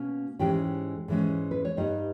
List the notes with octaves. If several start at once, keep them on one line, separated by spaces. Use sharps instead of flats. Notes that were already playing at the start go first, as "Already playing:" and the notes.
Already playing: B2 A#3 C#4
G#2 E3 G#3 C#4 G4 G5
G#2 E3 G#3 C#4
B4
C#5
G2 G3 B3 D#4 D#5